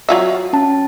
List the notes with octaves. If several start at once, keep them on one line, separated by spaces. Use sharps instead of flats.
F#3 F4 E5
C#4 A5